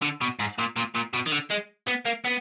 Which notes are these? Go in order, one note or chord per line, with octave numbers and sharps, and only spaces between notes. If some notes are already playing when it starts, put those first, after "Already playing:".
D3
B2
G#2
A#2
A#2
A#2
B2
D#3
D3
G#3
B3
A#3
B3